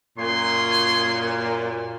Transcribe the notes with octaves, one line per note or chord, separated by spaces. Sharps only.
F#2 A#2 G#4 C#5 C6